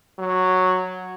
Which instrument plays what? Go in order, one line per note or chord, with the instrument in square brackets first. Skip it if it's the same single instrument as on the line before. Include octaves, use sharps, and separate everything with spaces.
[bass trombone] F#3